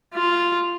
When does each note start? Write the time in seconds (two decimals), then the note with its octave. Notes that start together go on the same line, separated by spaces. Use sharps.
0.14 F4